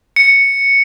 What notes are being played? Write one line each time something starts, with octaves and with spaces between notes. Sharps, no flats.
C#7